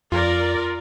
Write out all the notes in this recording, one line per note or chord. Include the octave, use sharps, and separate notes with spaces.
F2 F4 A#4 D5